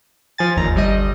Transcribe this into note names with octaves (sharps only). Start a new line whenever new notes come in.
F3 G#5 A6
G1 D#2 A#5
G1 G3 D#5